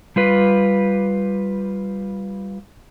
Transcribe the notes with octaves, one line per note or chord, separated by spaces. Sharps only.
G3 F4 B4